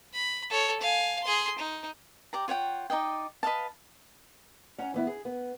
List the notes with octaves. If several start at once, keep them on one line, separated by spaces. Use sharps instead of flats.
B5
A4 C#5
F5 G#5
G#4 C6
D#4
G4 D5 A#5
F4 C#5 F#5 G5
D#4 D5 D#5 G5
B4 D#5 F5 A5
C#4 F#5 A#5
E3 B3 E4
G#4
B3